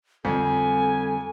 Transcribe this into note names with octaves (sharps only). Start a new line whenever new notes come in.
F2 D3 G3 C4 A4 G#5